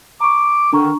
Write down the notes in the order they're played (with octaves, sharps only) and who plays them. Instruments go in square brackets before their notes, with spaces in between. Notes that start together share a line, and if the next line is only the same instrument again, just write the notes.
[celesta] A#5 C#6 [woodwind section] D6
[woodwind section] D3 D#3 [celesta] D4 A#5 C#6